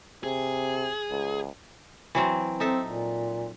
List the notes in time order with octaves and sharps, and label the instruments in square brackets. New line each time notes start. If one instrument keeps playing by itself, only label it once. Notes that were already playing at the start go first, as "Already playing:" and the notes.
[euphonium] C3 [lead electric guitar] G#4
[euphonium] C#2
[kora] E3 F#3 C4
[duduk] C4 [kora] D#4 A4 E5
[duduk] A#2